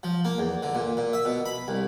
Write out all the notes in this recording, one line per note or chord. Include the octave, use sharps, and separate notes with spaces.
F3
A#3
E2
D3
A#2
A#2
E5
B2
B5
C2